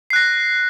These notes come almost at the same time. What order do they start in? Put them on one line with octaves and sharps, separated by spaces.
C7 F#6 A#6